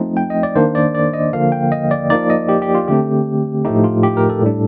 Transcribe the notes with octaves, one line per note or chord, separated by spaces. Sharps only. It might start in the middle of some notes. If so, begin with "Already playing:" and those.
Already playing: F3 A3 C4 D#4
G5
D#5
D5
D#3 A#3 D4 C5
D5
D5
D#5
D3 F3 A#3 F5
G5
D#5
D5
F3 A#3 D#4 D5
D#5
G4
G4
F4
D3 A3 C4 G4
A2 F3 A3 D#4 G4
F4
G4
A#4
A4
A2 G3 D4